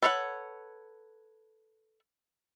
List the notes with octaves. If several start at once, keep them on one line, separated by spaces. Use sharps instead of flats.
A4 B4 C#5 F5 F#5